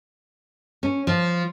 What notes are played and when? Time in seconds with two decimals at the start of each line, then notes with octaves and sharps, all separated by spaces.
0.83 C#4
1.07 F3